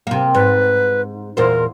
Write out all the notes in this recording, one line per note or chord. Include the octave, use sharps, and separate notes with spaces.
C3 A#3
G#2 B4
E2 A#2 A#4 C5